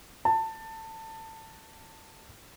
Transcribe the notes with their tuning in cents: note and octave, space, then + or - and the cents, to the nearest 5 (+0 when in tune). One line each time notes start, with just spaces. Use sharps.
A5 +20